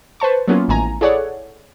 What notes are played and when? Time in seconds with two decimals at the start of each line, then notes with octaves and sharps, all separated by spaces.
0.20 B4 C5 A5 C#6
0.48 F#3 A#3 B3 C#4 E4 F4
0.68 A1 A2 D#3 G#5 A#5
1.01 E4 G#4 A4 C#5 D5 F#5